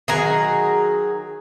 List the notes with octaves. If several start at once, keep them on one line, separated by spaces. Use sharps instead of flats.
D#3 F#3 G#4 A#5